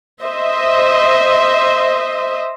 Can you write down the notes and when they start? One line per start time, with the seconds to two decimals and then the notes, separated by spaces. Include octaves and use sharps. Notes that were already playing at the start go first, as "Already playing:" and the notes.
0.23 C5 D#5 E5